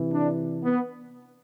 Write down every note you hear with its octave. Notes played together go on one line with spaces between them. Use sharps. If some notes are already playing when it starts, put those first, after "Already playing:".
Already playing: C3 E3
D4
B3